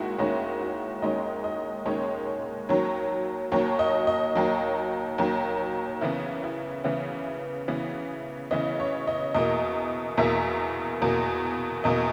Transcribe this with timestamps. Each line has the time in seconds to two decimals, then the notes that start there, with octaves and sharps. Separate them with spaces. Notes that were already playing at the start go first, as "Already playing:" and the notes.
Already playing: D#2 D#3 G#3 E4 F#4
0.18 D#2 D#3 G#3 C#4 F#4
0.61 F#4
1.02 D#2 D#3 G#3 C#4 D#5
1.44 D#5
1.86 D#2 D#3 G#3 C#4 C#5
2.69 D#2 D#3 F#3 C#5
3.52 D#2 D#3 F#3 C#5
3.79 D#5
4.07 D#5
4.35 D#2 D#3 F#3
5.18 D#2 D#3 F#3
6.01 C#3 E3 B3 E4
6.44 E4
6.84 C#3 E3 B3 E4
7.68 C#3 E3 B3
8.51 C#3 E3 B3 D#5
8.80 C#5
9.08 D#5
9.34 E2 B2 A#3 D#5
10.17 E2 B2 A#3 E5
11.02 E2 B2 A#3
11.84 E2 B2 A#3 D#5